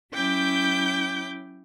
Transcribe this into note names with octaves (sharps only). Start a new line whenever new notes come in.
F#3 C#4 E4 G5 D6 G6